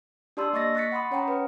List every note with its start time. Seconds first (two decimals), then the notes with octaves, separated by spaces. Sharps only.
0.37 D4 G4 D5 A5 C6 E6
0.53 A#3 D#5 C#6 A6 A#6
0.75 C#6 F#6 A6 B6 C#7
0.92 F#5 B5 C6 D#6
1.11 C#4 C#5 F#5 G5 A#5
1.28 B4